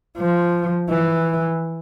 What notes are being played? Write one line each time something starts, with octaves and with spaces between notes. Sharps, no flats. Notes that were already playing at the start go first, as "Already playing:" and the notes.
F3
E3